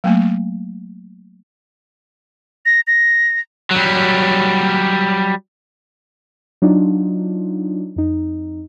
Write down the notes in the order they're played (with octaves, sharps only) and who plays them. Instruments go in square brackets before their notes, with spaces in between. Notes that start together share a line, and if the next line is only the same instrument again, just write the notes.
[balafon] F#3 A3 A#3
[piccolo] A#6
A#6
[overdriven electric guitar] F#3 G3
[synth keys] F#3 D4 D#4 F4
F2 D#4